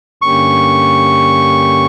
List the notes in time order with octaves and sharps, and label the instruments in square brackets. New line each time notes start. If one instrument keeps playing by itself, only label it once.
[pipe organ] G2 D3 A#3 C#4 G4 [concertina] C#6